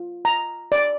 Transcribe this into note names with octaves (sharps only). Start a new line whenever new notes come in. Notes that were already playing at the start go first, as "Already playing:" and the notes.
Already playing: F4
A#5
D5